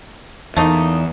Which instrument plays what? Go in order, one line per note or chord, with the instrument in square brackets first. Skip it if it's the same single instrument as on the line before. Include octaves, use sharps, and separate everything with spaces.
[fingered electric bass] E2 [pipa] A3 A#3 D#4